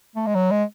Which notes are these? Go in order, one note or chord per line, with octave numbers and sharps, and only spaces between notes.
A3
G#3
F#3
G#3